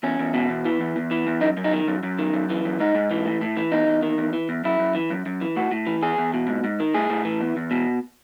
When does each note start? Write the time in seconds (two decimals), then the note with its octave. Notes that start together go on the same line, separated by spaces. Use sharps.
0.03 E2 C#4
0.19 E2
0.34 B2
0.49 E2
0.65 E3
0.81 E2
0.96 E2
1.11 E3
1.27 E2
1.41 F#2 D#4
1.57 F#2
1.64 D#4
1.73 D#3
1.88 F#2
2.03 F#2
2.18 D#3
2.34 F#2
2.50 E3
2.65 F#2
2.80 G#2 D#4
2.95 G#2
3.11 E3
3.26 A2
3.42 A2
3.57 E3
3.72 E2 D#4
3.87 E2
4.03 D#3
4.18 E2
4.33 E3
4.49 E2
4.64 F#2 E4
4.79 F#2
4.95 E3
5.10 F#2
5.26 F#2
5.41 E3
5.56 A2 F#4
5.71 A2
5.87 E3
6.03 E2 G#4
6.18 E2
6.34 B2
6.48 G#2
6.64 G#2
6.80 D#3
6.95 A2 G#4
7.10 A2
7.25 E3
7.41 E2
7.57 E2
7.71 B2